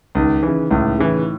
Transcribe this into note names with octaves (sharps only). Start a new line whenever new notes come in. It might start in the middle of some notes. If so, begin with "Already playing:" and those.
C#2 D#3
C#3 E3
C#2 A2
C#3 E3